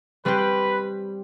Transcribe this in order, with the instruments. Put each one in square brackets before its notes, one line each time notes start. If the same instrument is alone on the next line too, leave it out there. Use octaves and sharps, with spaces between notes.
[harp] G3 C4 G4 [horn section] B4